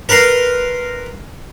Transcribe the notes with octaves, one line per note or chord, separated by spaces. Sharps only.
A#4 B4 A#5 C6